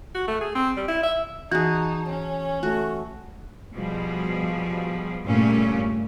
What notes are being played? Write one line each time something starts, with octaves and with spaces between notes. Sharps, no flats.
F#4
A3
G#4
C4
G3
E4
E5
E3 D#4 F#4 G#4 A5
C#4 C#5
A3 F#4
B2 F3 G3 G#4
G2 A#2 C#3 G3 A3 C#4